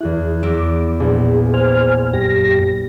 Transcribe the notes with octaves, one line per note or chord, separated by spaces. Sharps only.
E2 E4 G#4 F#6
E2 D6 E6 A#6
A#1 B3 G#4
C5 G#5 F6
F#2 G4 A#6